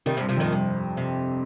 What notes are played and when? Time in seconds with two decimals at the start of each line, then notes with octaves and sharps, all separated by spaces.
0.06 C3 D#3 G3
0.17 C3 F3
0.21 G2
0.29 C3 F3
0.37 F2
0.40 A#2 D#3
0.52 G2 C3
0.97 C3